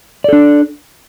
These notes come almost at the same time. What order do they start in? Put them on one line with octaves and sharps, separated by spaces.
D5 A4 D4